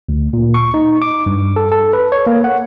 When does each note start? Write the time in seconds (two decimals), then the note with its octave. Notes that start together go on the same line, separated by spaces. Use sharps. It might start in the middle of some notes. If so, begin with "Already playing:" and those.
0.09 D2
0.33 A#2
0.54 C#6
0.74 D#4
1.02 D6
1.26 G2
1.56 A4
1.72 A4
1.93 B4
2.12 C#5
2.27 A#3
2.44 F#5